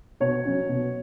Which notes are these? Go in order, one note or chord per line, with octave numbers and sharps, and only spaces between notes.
B2 C#5
F#3 C#4
B2